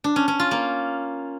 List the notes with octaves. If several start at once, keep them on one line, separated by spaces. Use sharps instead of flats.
D4
C#4
C#4
F4
A#3